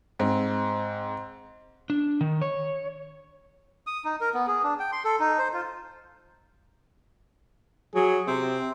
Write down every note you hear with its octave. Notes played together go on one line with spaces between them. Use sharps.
G#2 C4
D4
D#3
C#5
D#6
D#4
A#4
B3
G#4
D4
G5
C6
A4
D#4
C5
F4
F#3 G#4
C3 C4